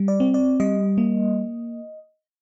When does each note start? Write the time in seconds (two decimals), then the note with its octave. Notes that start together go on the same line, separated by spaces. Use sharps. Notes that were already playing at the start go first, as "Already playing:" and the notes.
Already playing: G3
0.08 D5
0.20 C4
0.34 D5
0.60 G3 D#5
0.98 A#3